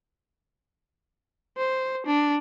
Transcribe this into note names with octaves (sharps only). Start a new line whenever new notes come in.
C5
D4